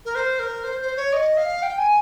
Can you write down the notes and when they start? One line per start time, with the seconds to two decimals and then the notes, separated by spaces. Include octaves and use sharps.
0.05 A#4
0.15 C5
0.39 A#4
0.64 C5
0.81 C5
0.96 C#5
1.13 D#5
1.37 F5
1.62 G5
1.78 G#5